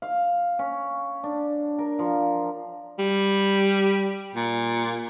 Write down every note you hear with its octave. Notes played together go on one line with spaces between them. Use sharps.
F5
C#4
D4
A#4
F3
G3
A#2